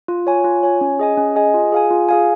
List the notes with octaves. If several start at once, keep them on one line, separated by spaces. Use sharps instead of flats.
F4
C#5 G#5
F4
C#5 G#5
C#4
G#4 D#5 G#5
C#4
G#4 D#5 G#5
F4
G#4 F5 G#5
F4
G#4 F5 G#5